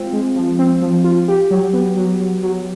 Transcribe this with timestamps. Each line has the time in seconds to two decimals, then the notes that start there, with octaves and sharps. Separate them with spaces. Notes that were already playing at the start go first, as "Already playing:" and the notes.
Already playing: G#3 C4 F4
0.13 G#3
0.36 F3
0.59 C4
0.82 F3
1.04 F4
1.28 G4
1.51 F#3
1.73 B3
1.97 F#3
2.20 F#3
2.43 F#3